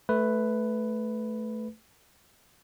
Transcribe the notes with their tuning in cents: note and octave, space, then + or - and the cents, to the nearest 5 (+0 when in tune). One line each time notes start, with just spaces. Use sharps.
A3 -10 B4 +5